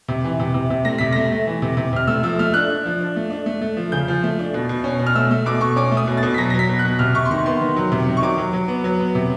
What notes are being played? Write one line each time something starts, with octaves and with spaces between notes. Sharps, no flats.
C3
E3
C3
C3
C3
A3 A#6
C3 B6
A3 A#6
A3
E3
C3
C3
C3 F6
A3 E6
F3 E6
A3 F6
D4 F#6
D4
F3
D4
A3
D4
A3
A3
F3
C#3 G6
F3
A3
D4
B2
B2
C#4
B2
F6
A3 E6
A3
B2 D6
B2 C#6
C#4 D6
A3
D#6
B2
A6
B2
B6
F#3 A#6
A#6
F#3
B6
B2
F#6
B2
C3 F6
C3 C#6
C6
D#3 C#6
B3 C6
D#3
F#3
C3
D#3
C#6
F#3 D6
F#3
F#3
B3
F#3
B3
C3